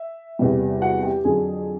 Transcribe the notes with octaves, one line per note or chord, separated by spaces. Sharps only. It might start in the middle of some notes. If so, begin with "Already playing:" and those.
Already playing: E5
E2 C3 E3 G3
F#4 F#5
G4 G5
F2 D3 F#3 G#4 G#5